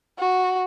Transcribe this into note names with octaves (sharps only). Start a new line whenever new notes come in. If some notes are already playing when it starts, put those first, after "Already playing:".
F#4